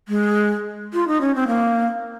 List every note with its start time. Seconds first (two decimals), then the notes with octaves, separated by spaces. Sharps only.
0.08 G#3
0.93 F4
1.08 D#4
1.21 C#4
1.35 C4
1.48 A#3